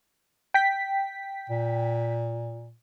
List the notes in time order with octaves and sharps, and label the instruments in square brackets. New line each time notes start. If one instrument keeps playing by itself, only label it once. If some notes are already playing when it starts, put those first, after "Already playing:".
[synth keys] G5 B6
[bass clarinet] A#2